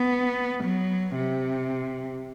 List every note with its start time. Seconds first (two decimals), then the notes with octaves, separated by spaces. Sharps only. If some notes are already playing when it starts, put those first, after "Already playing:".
Already playing: B3
0.64 F#3
1.15 C3